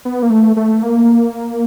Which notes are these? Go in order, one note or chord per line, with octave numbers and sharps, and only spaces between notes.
B3
A#3
A3
A3
A#3